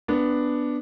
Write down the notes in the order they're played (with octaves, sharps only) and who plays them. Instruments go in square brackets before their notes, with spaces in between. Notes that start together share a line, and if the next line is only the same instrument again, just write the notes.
[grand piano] B3 D4